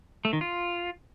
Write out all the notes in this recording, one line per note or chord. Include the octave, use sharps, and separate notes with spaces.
A3
D#3
F4